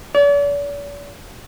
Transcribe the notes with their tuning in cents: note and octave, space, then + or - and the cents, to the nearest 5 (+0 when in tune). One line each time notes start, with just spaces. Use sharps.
D5 -45